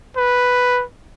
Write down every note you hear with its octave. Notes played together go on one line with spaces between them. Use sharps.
B4